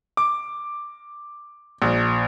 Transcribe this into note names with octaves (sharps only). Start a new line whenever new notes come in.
D6
A#1